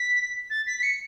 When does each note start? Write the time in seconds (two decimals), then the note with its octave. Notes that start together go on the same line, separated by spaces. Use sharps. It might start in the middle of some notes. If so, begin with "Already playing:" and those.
Already playing: B6
0.50 A6
0.66 B6
0.77 B6
0.82 C#7